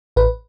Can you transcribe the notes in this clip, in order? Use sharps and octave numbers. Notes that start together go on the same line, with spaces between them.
A1 B4